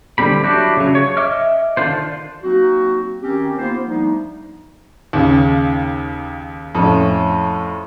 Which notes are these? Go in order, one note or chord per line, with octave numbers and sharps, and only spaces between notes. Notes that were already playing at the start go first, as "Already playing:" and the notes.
D3 G3 C4 G4 B5
F#3 D4 E4 F#4 G4
C#3 F#3
C#5
D#5 E5 D6 F6
D3 D#3 D4 F4 C5
F#3 A#3 C4 D#4 F#4
D#3 C4 C#4 G4
A#3 B3 D#4 F4 C5
F3 G3 A3 B3 D4 D#4
D#2 C#3
F2 A2 C#4